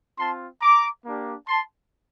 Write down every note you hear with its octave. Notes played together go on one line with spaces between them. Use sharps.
C4 F4 A5 C6
A#5 D6
A#3 D4 G4
A5 C6